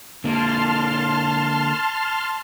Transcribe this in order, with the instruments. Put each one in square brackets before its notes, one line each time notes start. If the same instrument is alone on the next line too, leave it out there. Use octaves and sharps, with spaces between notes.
[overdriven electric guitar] D3 A#3 [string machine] A5 C6 F6